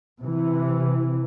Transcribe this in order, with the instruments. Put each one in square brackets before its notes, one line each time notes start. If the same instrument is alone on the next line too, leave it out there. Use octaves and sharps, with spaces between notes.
[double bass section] C3 E3